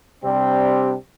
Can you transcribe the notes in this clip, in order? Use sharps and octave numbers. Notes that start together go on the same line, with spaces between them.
C3 G3 C4 D4 G4